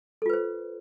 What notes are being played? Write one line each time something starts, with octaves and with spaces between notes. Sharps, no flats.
F4 A4 B4 C5